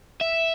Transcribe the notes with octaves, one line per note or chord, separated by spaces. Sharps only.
E5